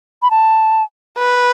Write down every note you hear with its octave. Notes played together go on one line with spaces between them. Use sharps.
B5
A5
B4